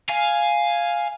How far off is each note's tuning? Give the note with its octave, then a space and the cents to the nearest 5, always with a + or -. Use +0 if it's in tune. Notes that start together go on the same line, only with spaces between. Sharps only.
F5 +0 G#5 +0